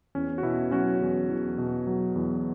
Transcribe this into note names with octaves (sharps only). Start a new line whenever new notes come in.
E2 C#4
F#4
B2 E4
F#3 C#4 F#4
E2
E2
B2
F#3
E2